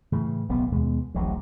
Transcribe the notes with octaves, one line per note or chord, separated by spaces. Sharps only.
A2 C#3 E3
D1 B1 B2 B3
D#2 B2 G#3 B3
D1 A1 D2 F#3